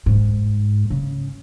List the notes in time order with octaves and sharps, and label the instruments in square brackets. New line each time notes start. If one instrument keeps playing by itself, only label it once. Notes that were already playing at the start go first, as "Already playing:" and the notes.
[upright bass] G#2
C#3